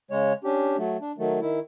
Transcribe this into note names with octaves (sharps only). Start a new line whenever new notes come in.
C#3 G#3 C#5
C#4 D4 G4
F#3 A3
D4
D#3 F#3 A3
D#3 E4